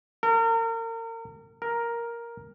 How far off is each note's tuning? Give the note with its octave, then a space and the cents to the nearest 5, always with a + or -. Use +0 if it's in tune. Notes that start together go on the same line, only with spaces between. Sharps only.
A#4 -35
A#4 +5